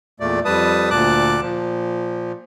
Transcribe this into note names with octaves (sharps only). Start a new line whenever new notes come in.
E2 A#2 A3 D5
F2 G3 B4 A5 D#6
D2 A#2 A5 D6 F#6
A#2 F3